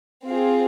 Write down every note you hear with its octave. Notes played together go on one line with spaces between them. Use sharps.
C4 F4 G#4